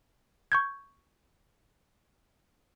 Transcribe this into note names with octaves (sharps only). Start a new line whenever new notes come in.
C#6 G6 G#6